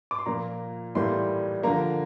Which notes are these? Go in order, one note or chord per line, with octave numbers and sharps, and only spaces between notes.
D6
C6
A#2 F3 A#3 A#5
A2 E3 G3 A#3 C6
D3 F3 A#3 A#5